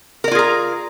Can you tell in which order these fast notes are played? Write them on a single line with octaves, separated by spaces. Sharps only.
A#4 D5 F4 G#4 A#5